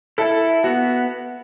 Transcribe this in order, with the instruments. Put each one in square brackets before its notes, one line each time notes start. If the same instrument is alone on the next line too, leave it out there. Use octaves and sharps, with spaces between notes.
[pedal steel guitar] E4 [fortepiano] A4
[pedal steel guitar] B3 [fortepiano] F#4